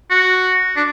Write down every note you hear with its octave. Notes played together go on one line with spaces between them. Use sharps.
F#4
D4